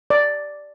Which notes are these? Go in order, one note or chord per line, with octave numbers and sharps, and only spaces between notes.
D5